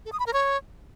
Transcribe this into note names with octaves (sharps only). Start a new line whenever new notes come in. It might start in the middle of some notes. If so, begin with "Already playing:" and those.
A4
D#6
B5
A#4
C#5